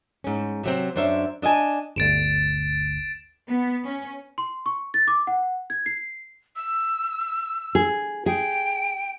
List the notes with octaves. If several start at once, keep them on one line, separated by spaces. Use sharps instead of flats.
G#2 C#4
C3 F#3 C4
F#2 D4 C5 C#5 E5
D4 D#5 E5 G#5 A5
G1 D2 A6 D7 E7
B3
C#4
C6
C#6
A6
D6
F#5
G#6
C7
E6
G#4
G#4 G5